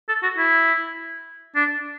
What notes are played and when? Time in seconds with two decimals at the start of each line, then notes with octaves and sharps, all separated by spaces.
0.09 A4
0.23 F#4
0.38 E4
1.55 D4